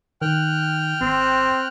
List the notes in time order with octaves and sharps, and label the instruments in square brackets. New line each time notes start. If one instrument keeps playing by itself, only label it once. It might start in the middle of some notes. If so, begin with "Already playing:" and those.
[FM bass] D#3 [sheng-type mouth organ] G5 F6 F#6
[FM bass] G#1 [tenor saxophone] C4